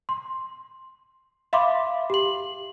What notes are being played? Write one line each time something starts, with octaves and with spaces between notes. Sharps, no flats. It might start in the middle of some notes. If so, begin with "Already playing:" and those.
C6
E5 F5 B5 C6 D6
G4 F#7